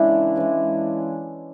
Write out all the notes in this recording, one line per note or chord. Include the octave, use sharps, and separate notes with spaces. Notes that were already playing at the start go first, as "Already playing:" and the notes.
Already playing: C#3 E3 G#3 D4 E4
C#3 E3 G#3